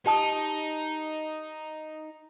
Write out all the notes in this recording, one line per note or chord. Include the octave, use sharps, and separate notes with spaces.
D#4 G4 A5 D#6